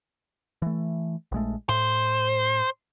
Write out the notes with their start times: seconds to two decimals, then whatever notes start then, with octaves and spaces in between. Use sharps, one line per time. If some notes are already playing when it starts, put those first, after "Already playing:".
0.62 E3 A3
1.32 A#1 G#3 A3
1.69 A2 C5